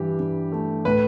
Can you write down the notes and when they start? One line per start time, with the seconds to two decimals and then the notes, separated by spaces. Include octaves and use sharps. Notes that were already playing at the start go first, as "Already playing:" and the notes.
Already playing: G2 E3 G4
0.19 G2
0.52 A3
0.85 A2 B4